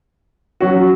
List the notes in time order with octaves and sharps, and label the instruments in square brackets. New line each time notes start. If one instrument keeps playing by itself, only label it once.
[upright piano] F#3 C#4 F#4